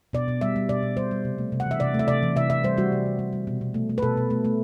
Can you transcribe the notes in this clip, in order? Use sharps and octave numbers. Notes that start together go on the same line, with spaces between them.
B2 D5
B2
G3 E5
G3
B2 D5
B2
G3 C5
G3
C3
A3
C3
F#5
E3 E5
C3 D5
A3
E5
C3 D5
E3
C3 E5
C3 E5
G3 C5
G3 F#4
C3
C3
G3
G3
B2
B2
A3
A3
B4
B2 A4
B2
A3
A3